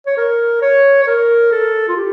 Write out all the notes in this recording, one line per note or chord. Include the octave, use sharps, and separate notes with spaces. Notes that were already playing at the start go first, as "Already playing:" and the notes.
C#5
A#4
C#5
C#5
A#4
A4
F4
G4